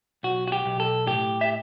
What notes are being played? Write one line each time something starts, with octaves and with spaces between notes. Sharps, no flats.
B1 F#4
F#4
G4
B1
A4
A2 G4
E5